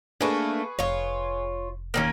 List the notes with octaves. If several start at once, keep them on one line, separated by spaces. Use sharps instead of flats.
A3 A#3 D4 G#4 B4 C#6
F1 F4 C#5
D#2 A#3 C4 C#4 F6